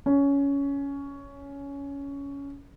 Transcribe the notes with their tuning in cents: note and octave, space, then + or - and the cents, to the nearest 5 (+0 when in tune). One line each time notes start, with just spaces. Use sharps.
C#4 +15